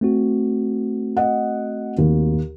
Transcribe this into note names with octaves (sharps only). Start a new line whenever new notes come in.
A3 C4 F#4
D#5 F#5
D#2